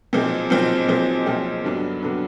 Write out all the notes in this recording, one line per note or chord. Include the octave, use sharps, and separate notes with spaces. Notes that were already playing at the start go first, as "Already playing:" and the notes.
B1 A#2 F3 G#3 C4
B1 A#2 F3 G#3 C4
B1 A#2 F3 G#3 C4
B1 A#2 F3 G#3 C4
G2 D3 F#3 B3 D4
D3 F#3 B3 D4